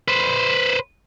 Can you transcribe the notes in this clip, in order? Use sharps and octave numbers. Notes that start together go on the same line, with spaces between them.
B4 C5